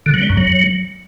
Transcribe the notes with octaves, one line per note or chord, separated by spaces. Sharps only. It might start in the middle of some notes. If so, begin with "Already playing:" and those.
D3
F#3
G3
F#2
F#3